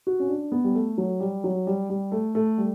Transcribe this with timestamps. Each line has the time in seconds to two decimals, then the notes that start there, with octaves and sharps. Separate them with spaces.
0.07 F#4
0.20 C#4
0.29 D4
0.52 B3
0.64 G3
0.75 A3
0.98 F#3
1.20 G3
1.44 F#3
1.67 G3
1.90 G3
2.12 A3
2.35 A3
2.58 G3